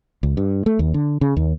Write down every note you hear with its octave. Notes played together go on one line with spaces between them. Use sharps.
C#2
G2
A3
D#2
D3
C#3
D#2